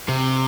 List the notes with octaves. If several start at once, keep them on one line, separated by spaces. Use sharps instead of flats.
C3